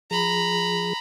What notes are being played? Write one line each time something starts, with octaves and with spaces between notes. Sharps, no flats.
F3 G#4 A#5 B5